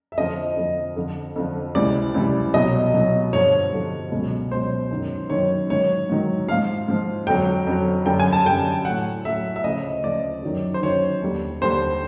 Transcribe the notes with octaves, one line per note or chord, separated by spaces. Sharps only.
E5
F2 D3 F3 D#5
F2 D3 F3
F2 D3 F3
F2 D3 F3
C#2 C3 E3 G3 D5
C#2 C3 E3 G3
C2 B2 F#3 D#5
C2 B2 F#3
G2 D3 F3 C#5
G2 D3 F3
C#2 B2 F#3
C#2 B2 F#3 C5
F#2 D#3 F#3
F#2 D#3 F#3 C#5
G#2 D#3 F#3 C#5
G#2 D#3 F#3
G#2 F3 F5
G#2 F3
F2 D3 F#3 G5
F2 D3 F#3
F#2 D3 G3 G5
G#5
A5
F#2 D3 G3 G5
A2 F#3 F#5
A2 F#3 E5
E5
D2 C#3 F3 D#5
D2 C#3 F3 D5
F#2 D#3 F#3
C5
F#2 D#3 F#3 C#5
D#2 D3 G3
D#2 D3 G3 C5